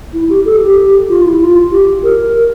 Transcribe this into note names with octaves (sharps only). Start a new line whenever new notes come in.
E4
G4
A4
G4
F4
E4
F4
G4
A#4
A#4